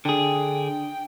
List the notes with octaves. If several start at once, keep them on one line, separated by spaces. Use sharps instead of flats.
D3 D4 G#4 G5